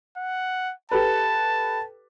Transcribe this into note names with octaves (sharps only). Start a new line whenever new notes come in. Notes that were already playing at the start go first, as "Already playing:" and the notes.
F#5
G4 A4 B4 A5